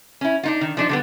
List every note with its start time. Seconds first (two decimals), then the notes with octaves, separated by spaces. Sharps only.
0.21 C#4 E4
0.43 D4 D#4 F4
0.61 D#3
0.77 F3 D4 D#4
0.89 D3 G3 B3